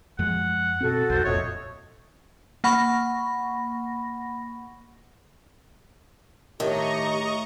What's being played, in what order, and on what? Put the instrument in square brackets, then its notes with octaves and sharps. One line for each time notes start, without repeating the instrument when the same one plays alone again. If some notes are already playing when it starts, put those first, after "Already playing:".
[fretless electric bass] F#2 F3 G#3 [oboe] F#5
[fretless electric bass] B2 C4 [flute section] F#4 A4
[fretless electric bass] B1 F2 [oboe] C5
[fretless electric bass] E1 F2 A#2 [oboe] C#5 [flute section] D#5 E5 D#6
[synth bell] A#3 F#5 B5 C#6 A#6
[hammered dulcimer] A2 [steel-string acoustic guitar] D#3 [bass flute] G4 [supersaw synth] D#5 A#5 C#6